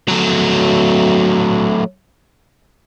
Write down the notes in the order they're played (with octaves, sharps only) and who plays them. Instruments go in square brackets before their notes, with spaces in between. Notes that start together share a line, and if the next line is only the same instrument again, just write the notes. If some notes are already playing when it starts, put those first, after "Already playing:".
[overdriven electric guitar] F#3 A3